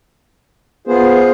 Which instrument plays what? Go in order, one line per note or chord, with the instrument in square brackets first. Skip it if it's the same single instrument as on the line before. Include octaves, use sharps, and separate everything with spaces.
[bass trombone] B3 [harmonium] F4 G#4 C5